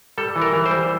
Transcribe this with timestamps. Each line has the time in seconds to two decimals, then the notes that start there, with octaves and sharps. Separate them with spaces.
0.18 G3 A4
0.36 E3
0.42 A#4
0.53 E3
0.66 C5
0.71 G3